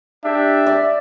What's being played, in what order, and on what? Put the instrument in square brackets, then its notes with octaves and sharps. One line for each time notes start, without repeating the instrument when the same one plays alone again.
[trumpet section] D4 G4 [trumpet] E5
[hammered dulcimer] D5